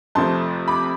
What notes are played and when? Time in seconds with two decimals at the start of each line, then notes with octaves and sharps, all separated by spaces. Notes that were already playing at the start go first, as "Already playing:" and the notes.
0.15 F2 C3 F3 A3 A5 C6
0.68 B5 D6